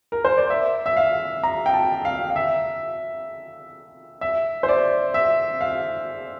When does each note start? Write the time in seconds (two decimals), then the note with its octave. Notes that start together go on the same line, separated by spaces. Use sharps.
0.12 A#4
0.25 C5
0.37 D5
0.50 E5
0.86 E5
0.97 F5
1.43 A#5
1.66 G5
1.73 A5
2.05 F5
2.30 F5
2.36 E5
4.21 E5
4.63 C5
4.69 D5
5.14 E5
5.61 F5